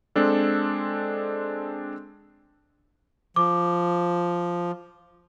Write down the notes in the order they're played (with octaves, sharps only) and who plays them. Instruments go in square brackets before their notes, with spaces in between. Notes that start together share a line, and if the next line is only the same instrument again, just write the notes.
[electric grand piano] G#3 C4 D4 A4
[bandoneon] F3 [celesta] D6